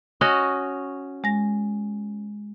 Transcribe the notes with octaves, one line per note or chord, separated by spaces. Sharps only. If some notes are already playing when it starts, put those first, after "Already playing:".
C#4 F#4 D#5
G#3 A#6